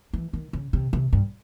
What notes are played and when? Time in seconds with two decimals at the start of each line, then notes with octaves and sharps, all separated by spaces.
0.13 E3
0.33 D#3
0.53 C#3
0.73 C3
0.93 C3
1.13 G2